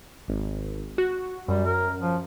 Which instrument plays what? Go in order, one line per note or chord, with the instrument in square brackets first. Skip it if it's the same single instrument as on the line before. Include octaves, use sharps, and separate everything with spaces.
[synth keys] G#1
F#4
[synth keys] F#2 [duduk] G3
[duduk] A#4
F3